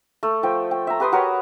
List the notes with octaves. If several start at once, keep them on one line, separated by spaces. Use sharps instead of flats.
A3
F3 G5
G5
E5 A#5
G4 B4 C6 D#6
F#4 A#4 B4 C#5